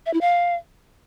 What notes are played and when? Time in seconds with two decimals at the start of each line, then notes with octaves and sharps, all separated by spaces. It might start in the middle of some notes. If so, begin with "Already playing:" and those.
0.06 E5
0.14 E4
0.21 F5